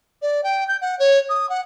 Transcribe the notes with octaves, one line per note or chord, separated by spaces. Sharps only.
D5
G5
G6
F#5
C#5
D#6
F#5